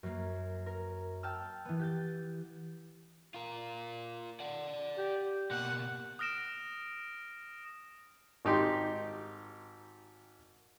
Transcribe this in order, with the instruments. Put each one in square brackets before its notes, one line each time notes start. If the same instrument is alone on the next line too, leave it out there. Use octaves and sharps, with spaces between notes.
[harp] F#2 A#3
A#4
G5 A5 E6 F6
E3 B3
G4 G6 A6
[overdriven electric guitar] F4 A#4
D5 F#5
[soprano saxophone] G4
[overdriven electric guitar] B2 A#3 [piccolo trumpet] F#5
[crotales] D#6 F6 A#6 D7 E7
[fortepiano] G#1 D#4 G4 C6